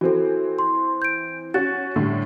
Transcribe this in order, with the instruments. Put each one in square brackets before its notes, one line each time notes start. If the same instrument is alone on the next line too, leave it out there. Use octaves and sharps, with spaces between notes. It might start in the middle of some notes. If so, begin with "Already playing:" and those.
[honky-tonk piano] E3 C4 [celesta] F#4 A4
[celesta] C6
G6 D7
[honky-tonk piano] C#4 F#4 [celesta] A6
[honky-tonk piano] A2 D3 G3